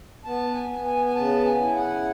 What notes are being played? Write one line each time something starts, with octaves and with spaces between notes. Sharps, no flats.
B3 A5
G#5
B3
G#5
G#5
C#3 A5
G#5
E4
F#5